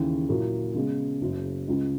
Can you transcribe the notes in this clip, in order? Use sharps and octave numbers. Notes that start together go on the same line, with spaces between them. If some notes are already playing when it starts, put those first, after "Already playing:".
Already playing: D#2 C#3 E3
A#2 F#3 A#3 E4
C#3 G#3 B3
F#1 F#2 C#3
C#2 C#3 G#3